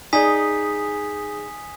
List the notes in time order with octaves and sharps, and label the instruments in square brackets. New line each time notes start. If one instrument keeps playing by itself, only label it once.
[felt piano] D#4 G#4 D5 [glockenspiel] G#5 D#6 B6